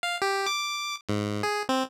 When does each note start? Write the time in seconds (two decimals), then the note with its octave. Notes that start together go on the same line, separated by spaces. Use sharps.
0.03 F5
0.22 G4
0.47 D6
1.09 G#2
1.43 G#4
1.69 C4